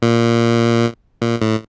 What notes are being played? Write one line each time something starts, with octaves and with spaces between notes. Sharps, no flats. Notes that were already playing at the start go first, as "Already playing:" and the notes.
A#2
A#2
A2